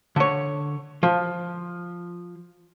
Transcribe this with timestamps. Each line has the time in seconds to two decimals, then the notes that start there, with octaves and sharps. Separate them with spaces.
0.16 D3 C#5
1.03 F3